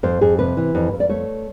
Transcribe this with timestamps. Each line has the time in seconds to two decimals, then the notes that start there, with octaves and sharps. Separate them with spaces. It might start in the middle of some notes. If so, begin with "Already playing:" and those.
0.03 F2 C5
0.21 F2 G#4
0.39 C3 B4
0.57 E3
0.75 F2
0.92 F2
1.00 D5
1.09 A3 C#5